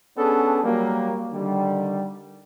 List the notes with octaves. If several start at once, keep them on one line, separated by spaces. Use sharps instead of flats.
B3 C#4 D4 G#4 A4
F#3 G3 A#3
D3 D#3 G3